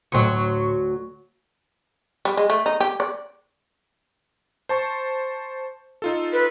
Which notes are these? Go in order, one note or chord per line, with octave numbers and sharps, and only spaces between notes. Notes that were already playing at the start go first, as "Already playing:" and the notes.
D2 A2 F#3 C6 C#6
G3
G#3
A3
D#4
G4
D5
C5 A5 C#6
D#4 F4 A4
B4